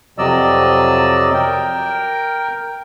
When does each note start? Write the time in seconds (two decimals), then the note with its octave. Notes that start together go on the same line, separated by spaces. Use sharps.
0.18 F2 C3 F#3 D5 D#5 E6
1.34 A#4 G5